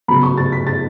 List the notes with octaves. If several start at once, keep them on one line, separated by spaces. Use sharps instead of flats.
C#3 F#3 B3 B5
C#6
A6
B6
A6